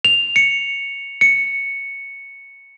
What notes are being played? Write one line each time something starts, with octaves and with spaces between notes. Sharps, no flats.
F7
C#7
C#7